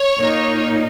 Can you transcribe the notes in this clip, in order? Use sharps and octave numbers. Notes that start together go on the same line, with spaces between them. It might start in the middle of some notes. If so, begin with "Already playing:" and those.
Already playing: C#5
A#2 A#3 D#4